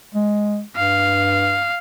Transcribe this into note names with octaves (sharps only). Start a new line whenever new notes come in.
G#3
G2 F5